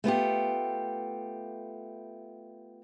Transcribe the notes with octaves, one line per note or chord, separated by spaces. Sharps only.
A3 B3 F4 G4